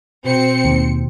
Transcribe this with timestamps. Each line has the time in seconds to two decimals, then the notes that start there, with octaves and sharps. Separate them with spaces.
0.24 B2 C4 C#7
0.65 D#2